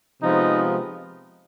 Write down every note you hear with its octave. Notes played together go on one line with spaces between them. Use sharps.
C3 F3 G#3 B3 D#4